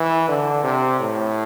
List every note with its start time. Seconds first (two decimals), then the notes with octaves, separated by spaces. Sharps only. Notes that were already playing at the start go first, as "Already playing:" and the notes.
Already playing: E3
0.28 D3
0.63 C3
1.00 A2